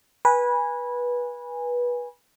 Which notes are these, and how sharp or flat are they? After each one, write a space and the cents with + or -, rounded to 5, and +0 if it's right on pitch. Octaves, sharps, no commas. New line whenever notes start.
B4 -20 G#5 -15